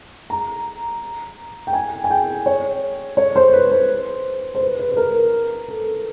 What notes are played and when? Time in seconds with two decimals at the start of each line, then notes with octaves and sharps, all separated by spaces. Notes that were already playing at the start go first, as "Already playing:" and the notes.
0.30 A#5
1.67 G5
1.73 G#5
2.04 G#5
2.10 G5
2.46 C#5
3.17 C#5
3.36 C5
3.53 B4
3.71 C5
4.55 C5
4.60 B4
4.79 B4
4.91 B4
4.97 A#4
5.68 A4